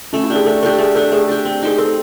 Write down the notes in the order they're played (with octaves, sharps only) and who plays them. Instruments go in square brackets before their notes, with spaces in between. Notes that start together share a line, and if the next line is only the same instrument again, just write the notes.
[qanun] A3 [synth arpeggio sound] C#4
[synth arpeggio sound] E4
[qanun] D4 G4
[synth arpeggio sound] G#4
[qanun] A3 [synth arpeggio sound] A4
[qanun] D4 G4 [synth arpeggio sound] A4
[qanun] A3 [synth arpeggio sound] G#4
[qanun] D4 G4 [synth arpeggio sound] A4
[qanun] A3 [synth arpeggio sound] G#4
[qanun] D4 G4
C4
[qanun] D#4 G4 C5 [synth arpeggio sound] G#4
[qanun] C4 [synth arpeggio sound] A4